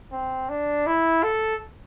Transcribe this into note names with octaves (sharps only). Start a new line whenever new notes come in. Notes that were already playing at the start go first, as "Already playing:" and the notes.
C4
D4
E4
A4